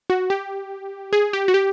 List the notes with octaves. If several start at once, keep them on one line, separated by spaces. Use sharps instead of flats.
F#4
G4
G#4
G4
F#4
G4